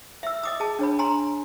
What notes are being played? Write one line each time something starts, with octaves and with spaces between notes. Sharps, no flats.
E5 E6
D#5 D6 D#6
G#4 A5
D4 C#5 B5
G#5 A#5 C6